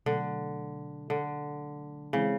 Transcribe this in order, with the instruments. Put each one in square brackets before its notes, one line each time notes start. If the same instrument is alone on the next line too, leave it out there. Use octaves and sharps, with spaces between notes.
[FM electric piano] B2 F#3 A3 [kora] D3
[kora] D3
[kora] C#3 [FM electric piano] E3 G#3 C4 E4